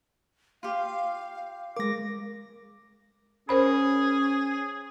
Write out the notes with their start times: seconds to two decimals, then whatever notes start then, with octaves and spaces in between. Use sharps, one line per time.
0.63 F4 G4 F5
1.77 G#3 A#4 D6 A#6
3.49 C#4 G#4 A#4 C5 B5